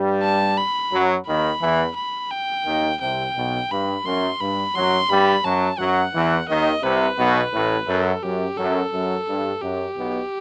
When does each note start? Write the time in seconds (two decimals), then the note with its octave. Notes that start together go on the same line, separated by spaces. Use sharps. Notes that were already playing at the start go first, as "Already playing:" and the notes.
Already playing: G2 G3
0.23 A5
0.57 B5
0.92 F#2 F#3
1.26 D#2 D#3 B5
1.61 E2 E3
1.96 B5
2.31 G5
2.65 D#2 D#3
3.00 C2 C3 G5
3.35 B1 B2
3.70 G2 B5
4.05 F#2 C6
4.40 G2 B5
4.74 F#2 F#3 C6
5.09 G2 G3 B5
5.44 F#2 F#3 A5
5.79 F#2 F#3 F#5
6.13 E2 E3
6.48 D#2 D#3 D#5
6.83 C2 C3 B4
7.18 B1 B2
7.53 A1 A2
7.88 F#2 A4
8.23 F#2 G4
8.57 F#2 A4
8.92 F#2
9.28 G2
9.62 F#2 G4
9.96 B1 B2